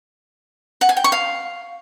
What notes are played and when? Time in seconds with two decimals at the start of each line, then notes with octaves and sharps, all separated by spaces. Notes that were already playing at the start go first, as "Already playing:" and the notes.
0.81 F#5
0.89 G#5
0.97 G5
1.04 C#6
1.12 F5